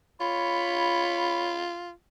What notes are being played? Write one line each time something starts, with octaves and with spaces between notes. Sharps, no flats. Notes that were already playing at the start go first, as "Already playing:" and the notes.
F4 C#5 B5